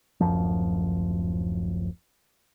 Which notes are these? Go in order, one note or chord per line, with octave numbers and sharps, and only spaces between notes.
D1 F#2 F3